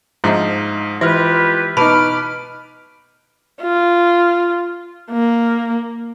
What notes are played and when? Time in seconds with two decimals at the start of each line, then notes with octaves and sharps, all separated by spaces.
0.24 G#2 F3 D4 D#4 E5
1.01 E3 G#3 E4 F4 G4 B4 F6
1.77 B2 B3 D#4 B4 A5 B5 D6 F6
3.62 F4
5.12 A#3